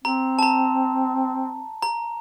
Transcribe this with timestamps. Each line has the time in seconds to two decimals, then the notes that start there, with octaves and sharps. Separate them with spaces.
0.04 C4 A#5
0.39 A5
0.43 A#5
1.83 A#5